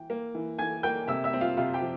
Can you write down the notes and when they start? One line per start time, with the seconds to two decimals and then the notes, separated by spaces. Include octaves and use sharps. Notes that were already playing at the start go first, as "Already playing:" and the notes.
Already playing: E3 G5
0.10 A#3
0.35 E3
0.58 E3 G#5 G#6
0.83 A#3 G5 G6
1.08 C3 E5 E6
1.24 E5 E6
1.33 C4
1.41 F4 F5
1.57 C3 F4 F5
1.73 G4 G5
1.82 F3